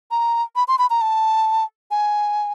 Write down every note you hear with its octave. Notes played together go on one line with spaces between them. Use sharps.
A#5
B5
C6
B5
A#5
A5
G#5